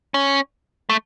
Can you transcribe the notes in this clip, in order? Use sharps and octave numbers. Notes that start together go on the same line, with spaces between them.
C#4
A3